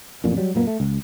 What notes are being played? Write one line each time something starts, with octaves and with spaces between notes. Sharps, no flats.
A1 F2 A#2
F#3 G3
F#2 A#2 A#3 B3
A3
C#2